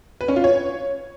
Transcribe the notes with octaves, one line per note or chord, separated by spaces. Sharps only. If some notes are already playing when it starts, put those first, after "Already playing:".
B4
C#4
F4
C#5